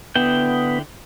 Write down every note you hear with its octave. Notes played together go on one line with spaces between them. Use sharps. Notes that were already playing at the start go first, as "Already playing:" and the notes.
D3 B3 E4 G5